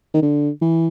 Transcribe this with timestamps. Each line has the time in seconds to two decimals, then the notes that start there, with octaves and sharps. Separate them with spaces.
0.14 D#3
0.22 D3
0.62 E3